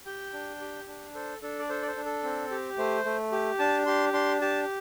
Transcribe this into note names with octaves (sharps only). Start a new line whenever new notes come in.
G4 G5
D4
G4
D4
A4 C5
D4 A4
D5
A4 C5
D5
C5
D4
A4
C4
G4
A3 C5
A3
G4
D4 A5
G4 C6
D4 C6
G4 A5